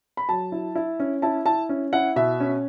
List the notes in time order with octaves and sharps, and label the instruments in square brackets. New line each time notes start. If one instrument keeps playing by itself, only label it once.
[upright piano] B5
F#3 A5
E4
E4
C#4
E4 A5
E4 A5
C#4
E4 F#5
B2 E5
C#4